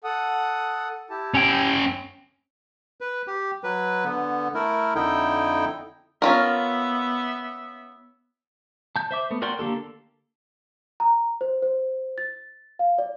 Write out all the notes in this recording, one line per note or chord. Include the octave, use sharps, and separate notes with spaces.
A4 F#5 D#6
E4 G4 A5
C#4 G5
B4
G4
F#3 B4
D3 B3
A3 E4 A#4
F2 D3 D#4 E4 G5
B3 C#4 F4 A#4 E5
A5 G6
C5 E5 D6
A3 B3
F#4 A#4 D5 G5 C6
D3 A#3 G4 A4
A#5
C5
C5
A6
F5
D5